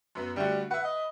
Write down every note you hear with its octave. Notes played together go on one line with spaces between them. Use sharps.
F#2 B3
D3 G3 A3 F#4
B4 E5 F#5
D#5